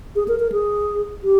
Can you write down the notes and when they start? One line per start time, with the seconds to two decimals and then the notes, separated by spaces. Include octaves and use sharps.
0.16 G#4
0.28 A#4
0.40 A#4
0.52 G#4
1.23 G4